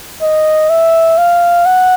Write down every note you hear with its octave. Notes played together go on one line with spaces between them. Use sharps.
D#5
E5
F5
F#5